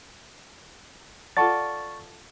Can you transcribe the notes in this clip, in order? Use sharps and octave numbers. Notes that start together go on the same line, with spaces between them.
F4 A4 D5 F#5 A5 C#6 A6